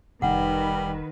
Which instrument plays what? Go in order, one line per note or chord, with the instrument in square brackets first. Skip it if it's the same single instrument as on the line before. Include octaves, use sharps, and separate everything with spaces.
[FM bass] F1 [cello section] D#3 B4 [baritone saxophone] G3 [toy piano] F#5